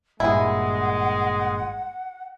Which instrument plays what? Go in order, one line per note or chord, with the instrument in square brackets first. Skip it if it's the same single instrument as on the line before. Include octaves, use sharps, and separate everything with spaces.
[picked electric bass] G#1 G2 A#2 [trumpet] G#3 [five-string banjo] E4 G#4 [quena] F#5